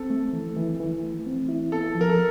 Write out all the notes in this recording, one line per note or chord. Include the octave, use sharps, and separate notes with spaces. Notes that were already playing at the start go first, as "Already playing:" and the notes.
Already playing: C4 A4
A3
E3
E3
E3
A3
C4
E4
B3 A4
F3
A#4
A4